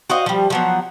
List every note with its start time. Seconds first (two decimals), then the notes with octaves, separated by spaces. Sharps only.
0.10 F#4 C5 D#5 F5
0.26 F3 G3
0.50 F3 F#3 B3